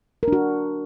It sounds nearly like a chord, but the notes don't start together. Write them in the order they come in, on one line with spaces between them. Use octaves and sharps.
A#4 D4 F#4